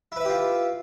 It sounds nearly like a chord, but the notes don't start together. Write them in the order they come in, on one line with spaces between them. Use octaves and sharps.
E4 B4 E5 G4 F4